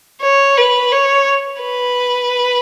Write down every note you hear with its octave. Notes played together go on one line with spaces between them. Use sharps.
C#5
B4
C#5
B4